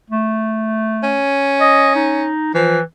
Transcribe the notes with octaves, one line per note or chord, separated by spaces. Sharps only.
A3
C#4
D#5
D#4
E3 F3